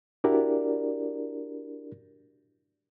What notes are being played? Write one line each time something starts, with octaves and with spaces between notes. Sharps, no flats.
D4 E4 F#4 G4 A#4 D5